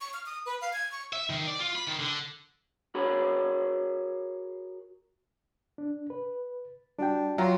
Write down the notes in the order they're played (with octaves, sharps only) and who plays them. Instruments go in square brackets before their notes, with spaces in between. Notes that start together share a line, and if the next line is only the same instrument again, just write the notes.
[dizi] C#6
F6
D#6
B4
F5
G#6
C#6
[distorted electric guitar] E5
D#3
D5
F4
B5
D#3
D3
[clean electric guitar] F#4 G#4 A#4 C#5 B5
[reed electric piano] D4
B4
[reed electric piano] G3 F#4 G5 [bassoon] D4
[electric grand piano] F#3 [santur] F4 A#5 [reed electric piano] E5 G5 C6